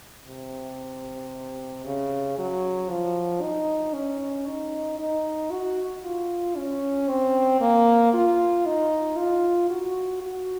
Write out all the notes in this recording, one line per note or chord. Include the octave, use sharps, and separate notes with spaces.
C3
C#3
F#3
F3
D#4
C#4
D#4
D#4
F#4
F4
C#4
C4
A#3
F4
D#4
F4
F#4
F#4